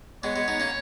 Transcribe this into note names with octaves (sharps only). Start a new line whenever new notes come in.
G#3 B3 C#5
G#3 B3
B3 D#4
A#3 C#4